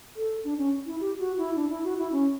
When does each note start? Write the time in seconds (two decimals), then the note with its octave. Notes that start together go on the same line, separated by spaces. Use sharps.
0.17 A4
0.44 D4
0.58 C#4
0.86 E4
1.01 G4
1.19 F#4
1.38 E4
1.56 D4
1.70 E4
1.84 F#4
1.98 E4
2.12 C#4